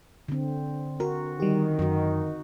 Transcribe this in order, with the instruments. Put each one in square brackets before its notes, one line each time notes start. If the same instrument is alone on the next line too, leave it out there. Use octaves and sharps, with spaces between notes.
[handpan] D3 C4
[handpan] F#4 [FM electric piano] A#4
[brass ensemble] D#3 [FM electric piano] G3 G4
[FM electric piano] F#2 [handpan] D#4 F#4